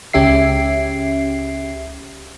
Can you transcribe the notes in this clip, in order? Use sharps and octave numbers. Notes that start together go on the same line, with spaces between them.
C#2 C#4 G4 E5 C7